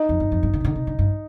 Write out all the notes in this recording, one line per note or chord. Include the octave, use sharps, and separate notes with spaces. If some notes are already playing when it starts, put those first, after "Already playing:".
Already playing: D#4
F2
G2
F2
G2
D3
C3
D3
C3
D3
G2